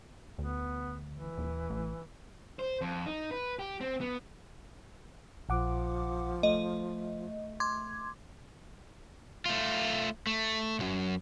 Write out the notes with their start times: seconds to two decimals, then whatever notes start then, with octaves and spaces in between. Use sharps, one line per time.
0.38 D2 B3
1.13 E3
1.38 D#1
1.70 A1
2.59 C5
2.81 F2
3.06 D#4
3.31 B4
3.59 G4
3.81 C4
4.01 B3
5.49 A#1 F3 F#5 D6
6.43 A3 D#5
7.60 C6 D6 G#6
9.46 A3 F4
10.27 A3
10.79 B1 F#2